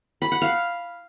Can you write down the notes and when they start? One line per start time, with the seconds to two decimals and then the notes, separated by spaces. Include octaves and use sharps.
0.22 B5
0.32 F#5
0.42 F5